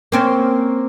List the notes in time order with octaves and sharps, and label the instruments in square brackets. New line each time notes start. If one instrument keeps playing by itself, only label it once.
[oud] A#3 C4 C#4